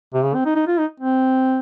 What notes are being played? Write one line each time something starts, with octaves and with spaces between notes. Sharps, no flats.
C3
C#3
C4
D#4
D#4
F4
D#4
C4